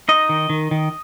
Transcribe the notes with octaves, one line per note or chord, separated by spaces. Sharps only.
D#4 D#5
D#3
D#3
D#3